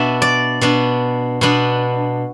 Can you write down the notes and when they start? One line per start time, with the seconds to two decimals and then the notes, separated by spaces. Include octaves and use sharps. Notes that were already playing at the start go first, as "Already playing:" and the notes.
Already playing: B2 B3 D4 E5
0.22 D5
0.61 B2 B3 D4
1.41 B2 B3 D4